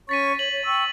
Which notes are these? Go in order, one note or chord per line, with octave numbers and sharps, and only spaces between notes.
C#4 C#5 C#6 A6 B6 D#7
C#5 F#7
C#5
G5 C#6 E6